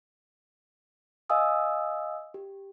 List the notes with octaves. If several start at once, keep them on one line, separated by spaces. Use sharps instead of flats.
D#5 F5 G#5 D#6 E6
G4